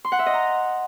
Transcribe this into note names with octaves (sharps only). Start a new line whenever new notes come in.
C6
F#5
E5
D#5
A#5